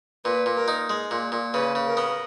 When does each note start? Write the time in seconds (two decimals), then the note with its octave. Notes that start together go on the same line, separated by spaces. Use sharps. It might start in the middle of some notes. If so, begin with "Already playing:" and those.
0.24 A#2 B4
0.46 A#2
0.57 A#4
0.68 D#4
0.90 G#3
1.11 A#2
1.32 A#2
1.54 C#3 B4
1.75 C#3
1.86 A#4
1.97 B3